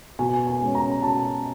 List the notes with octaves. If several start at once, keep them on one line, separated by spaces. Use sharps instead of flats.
B2 G#5
G#5
G#3 C#4
A#5
B2 A5